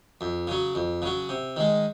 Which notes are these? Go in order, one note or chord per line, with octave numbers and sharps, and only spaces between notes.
F2
C#3 F#3
F2
C#3 F#3
C3
D#3 G#3